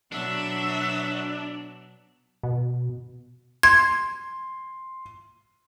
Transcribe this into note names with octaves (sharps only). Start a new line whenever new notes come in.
B2 F#3 D4 E5
B2
C6 G#6